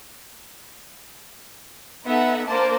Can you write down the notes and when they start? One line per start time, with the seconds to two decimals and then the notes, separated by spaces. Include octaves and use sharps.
2.06 B3 D#4 A4 E5 F#5
2.47 A#3 D4 A#4 C5 A5 D6